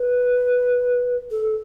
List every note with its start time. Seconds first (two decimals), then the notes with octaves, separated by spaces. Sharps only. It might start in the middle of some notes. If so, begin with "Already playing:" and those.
Already playing: B4
1.31 A4